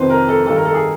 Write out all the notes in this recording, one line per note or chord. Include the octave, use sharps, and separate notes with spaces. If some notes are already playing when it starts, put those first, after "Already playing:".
Already playing: F2 C3 D#3 B4 C5
A#4
A4
G2 D#3 A4
A#4
A4
G#4